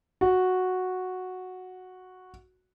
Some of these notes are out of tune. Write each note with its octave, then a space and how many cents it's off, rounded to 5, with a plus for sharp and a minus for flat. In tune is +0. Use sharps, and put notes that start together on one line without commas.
F#4 -5